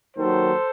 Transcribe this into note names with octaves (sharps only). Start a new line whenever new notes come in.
D#2 D#3 F#3 A4 C5